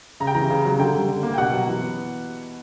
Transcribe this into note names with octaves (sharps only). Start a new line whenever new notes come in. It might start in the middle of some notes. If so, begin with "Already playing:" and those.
C#3 A#5
G5
E3 A#5
C#3
F#3
D3 G5
G3
D3
A#3
G5
B2 F#5
F#3
E3
B3